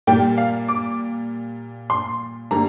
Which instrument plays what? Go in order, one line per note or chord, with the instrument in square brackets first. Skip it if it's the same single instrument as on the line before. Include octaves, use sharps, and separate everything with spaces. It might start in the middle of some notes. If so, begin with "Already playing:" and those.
[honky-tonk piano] A#2 G3 A#3 G5
F5
D6
C6
D3 G3 A#3 A#5